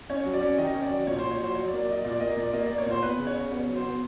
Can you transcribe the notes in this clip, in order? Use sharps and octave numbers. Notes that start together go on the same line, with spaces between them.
C#4 C#5
F#3
D5
C#4
D#3 D#5
C#4
D5
F#3
A#2 C#5
A#2 C5
C#5
F#3 C5
F#3 C#5
D5
A#3
D5
F#3 D#5
A#2 D5
A#3 D#5
A#2 D5
A#3 D#5
A#3 D5
C#5
A#2 C5
B3 B4
C#3
C#5
C#3
B3 C#5
F#3
C5
B3